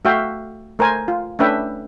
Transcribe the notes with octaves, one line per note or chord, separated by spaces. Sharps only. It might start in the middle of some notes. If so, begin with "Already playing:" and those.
A3 F#4 E5 F5 G5
A3 A#4 C5 G#5
F4
A3 C#4 D4 B4 E5 G5